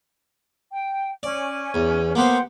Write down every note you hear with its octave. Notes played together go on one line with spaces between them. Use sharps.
G5
C#4 D5
E2
A#3 B3 G4 C5 F#5 C6